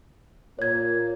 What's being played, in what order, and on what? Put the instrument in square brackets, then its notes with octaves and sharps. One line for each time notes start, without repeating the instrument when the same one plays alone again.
[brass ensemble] A#2 A#3 [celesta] C#5 G#6